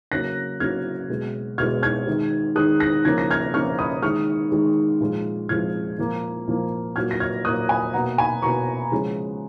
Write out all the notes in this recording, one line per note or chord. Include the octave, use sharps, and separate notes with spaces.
C#3 F#3 A#3 F#6 A#6
C#3 F#3 A#3 F6 G#6
B2 G#3
B2 G#3 F6 G#6
F6 G#6
D#3 G#3
D#3 G#3 D#6 F#6
F#6 A#6
C#3 F3 A#3 G#6
A#6
F6 G#6
C#3 F3 A#3 C#6 F6
B5 D#6
D#3 G#3 C#6 F6
D#3 G#3
A#2 F3 G#3
A#2 F3 G#3 F6 G#6
A#2 F3 A#3
A#2 F3 A#3
A#2 F#3 A#3 F6 G#6
A#6
F6 G#6
A#2 F#3 A#3 D#6 F#6
G#5 B5
B2 A#3 F#5 A#5
G#5 B5
B2 A#3 A#5 C#6
C#3 F3 G#3